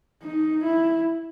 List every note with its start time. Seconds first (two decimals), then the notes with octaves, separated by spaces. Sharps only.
0.23 D#4
0.64 E4